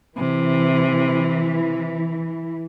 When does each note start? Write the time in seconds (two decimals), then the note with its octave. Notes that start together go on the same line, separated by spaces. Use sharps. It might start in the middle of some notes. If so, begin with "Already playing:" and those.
0.17 C3 E3